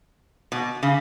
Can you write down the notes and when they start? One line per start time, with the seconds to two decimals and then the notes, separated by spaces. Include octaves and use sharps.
0.52 B2
0.83 C#3